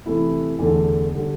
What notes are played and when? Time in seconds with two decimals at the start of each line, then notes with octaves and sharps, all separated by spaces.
0.06 C3 E3 A3 E4
0.59 E2 D3 A3
1.14 D3 G3